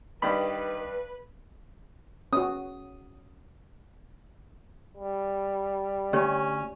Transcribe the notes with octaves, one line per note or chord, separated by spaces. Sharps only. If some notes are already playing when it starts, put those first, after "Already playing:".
G2 D#3 G3 G4 B4 B5
C#4 F#4 D#6
G3
D2 C#4 G4 C#5 D5